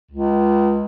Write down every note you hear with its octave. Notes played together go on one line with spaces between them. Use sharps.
C#2